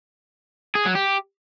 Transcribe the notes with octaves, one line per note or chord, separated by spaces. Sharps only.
G#4
F#3
G4